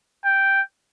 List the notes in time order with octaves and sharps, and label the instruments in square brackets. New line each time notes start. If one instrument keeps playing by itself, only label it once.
[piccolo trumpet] G5